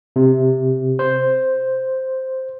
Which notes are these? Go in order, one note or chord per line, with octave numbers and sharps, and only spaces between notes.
C3
C5